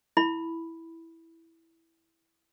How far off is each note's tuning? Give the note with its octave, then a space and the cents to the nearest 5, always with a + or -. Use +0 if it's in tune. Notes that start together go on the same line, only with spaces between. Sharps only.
E4 -5 B5 +0